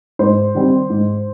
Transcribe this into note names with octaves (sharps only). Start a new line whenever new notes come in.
G#2 C5
D#3 G3 C4
G#2